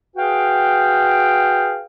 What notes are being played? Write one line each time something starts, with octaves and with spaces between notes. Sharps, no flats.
F#4 G#4 B4 F5 G5